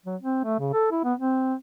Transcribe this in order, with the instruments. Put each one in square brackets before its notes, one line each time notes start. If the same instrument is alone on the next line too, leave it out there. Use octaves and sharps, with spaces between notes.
[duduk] F#3
C4
A3
C#3
A4
E4
B3
C4